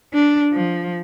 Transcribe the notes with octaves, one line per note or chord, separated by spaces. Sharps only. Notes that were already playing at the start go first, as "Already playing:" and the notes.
D4
F3